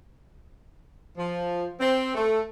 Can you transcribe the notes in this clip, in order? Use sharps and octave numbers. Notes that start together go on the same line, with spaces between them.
F3
C4
A3